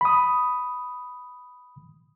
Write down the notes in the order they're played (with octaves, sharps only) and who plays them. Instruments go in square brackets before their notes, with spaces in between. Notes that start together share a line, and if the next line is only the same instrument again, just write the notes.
[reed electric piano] B5 D#6